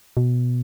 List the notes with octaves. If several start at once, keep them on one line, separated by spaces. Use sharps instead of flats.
B2